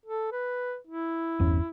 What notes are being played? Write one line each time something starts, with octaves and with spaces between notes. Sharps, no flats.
A4
B4
E4
G1 E2 C#4